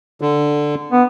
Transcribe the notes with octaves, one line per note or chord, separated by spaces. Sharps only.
D3
B3